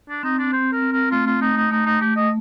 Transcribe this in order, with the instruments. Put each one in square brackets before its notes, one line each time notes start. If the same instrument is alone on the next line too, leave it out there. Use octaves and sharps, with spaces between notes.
[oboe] D4
[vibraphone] C4 [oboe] D#4
[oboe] D4
[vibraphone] C4 [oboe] C5
[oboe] A#4
[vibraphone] C4
[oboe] A#4
[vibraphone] A3 [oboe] F4
[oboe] F4
[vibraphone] A3 [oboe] D#4
[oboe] D#4
[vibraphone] A3 [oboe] D#4
[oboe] D#4
[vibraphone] A3 [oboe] G4
[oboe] D#5